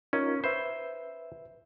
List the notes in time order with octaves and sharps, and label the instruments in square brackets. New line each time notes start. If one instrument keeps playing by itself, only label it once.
[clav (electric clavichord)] C#4 [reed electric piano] D#4 F4 A#4
[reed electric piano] B4 E5 [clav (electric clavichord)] C5